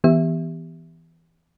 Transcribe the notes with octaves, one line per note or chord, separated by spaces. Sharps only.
E3 B3 G4 E5